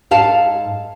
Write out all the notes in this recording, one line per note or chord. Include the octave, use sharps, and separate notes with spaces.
G#2 A4 F5 A5